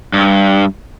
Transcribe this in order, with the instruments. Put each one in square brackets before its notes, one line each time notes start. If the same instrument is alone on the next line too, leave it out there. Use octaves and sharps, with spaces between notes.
[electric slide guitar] G2